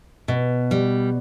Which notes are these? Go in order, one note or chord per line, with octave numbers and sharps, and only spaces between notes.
B2
G3